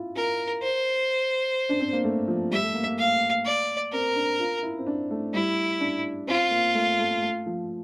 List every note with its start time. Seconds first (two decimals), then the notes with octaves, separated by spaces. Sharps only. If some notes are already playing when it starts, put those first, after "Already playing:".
Already playing: E4 F4
0.16 F4 A#4
0.62 C5
1.69 D4
1.80 C4
1.93 A#3
2.04 A3
2.28 F3
2.51 G3 E5
2.62 A3
2.75 A#3
2.86 A#3
2.98 F5
3.45 D5
3.92 C4 A#4
4.15 D4
4.40 F4
4.63 E4
4.78 C4
4.87 D4
5.11 A3
5.33 G3 E4
5.80 D4
6.27 C4 F4
6.51 A#3
6.74 A3
6.99 A3
7.21 A3
7.46 F3